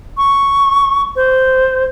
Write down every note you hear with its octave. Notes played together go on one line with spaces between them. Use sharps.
C#6
C5